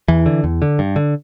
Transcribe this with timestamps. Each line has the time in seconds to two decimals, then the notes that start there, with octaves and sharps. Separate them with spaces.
0.08 E2 E3
0.26 D3
0.44 E2
0.62 D3
0.79 G2
0.96 D3